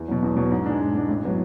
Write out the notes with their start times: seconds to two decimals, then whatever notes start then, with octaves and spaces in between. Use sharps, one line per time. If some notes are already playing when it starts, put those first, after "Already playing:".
Already playing: E2
0.08 B2 F#3
0.22 E2
0.37 B2 F#3
0.51 G#2
0.66 G#3 D4
0.80 G#2
0.94 G#3 D4
1.09 A1
1.23 A2 F#3 B3 E4